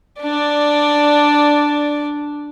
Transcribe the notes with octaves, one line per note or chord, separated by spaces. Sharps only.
D4 D5